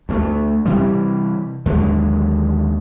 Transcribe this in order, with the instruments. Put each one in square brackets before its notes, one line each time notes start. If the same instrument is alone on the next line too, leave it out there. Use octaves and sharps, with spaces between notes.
[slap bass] D2 F#3 A3
C3 E3 G3
D#2 D3 F#3 G#3